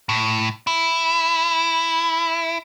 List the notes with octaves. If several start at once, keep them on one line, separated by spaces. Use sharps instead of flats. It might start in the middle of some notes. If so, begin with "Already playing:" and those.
A2
E4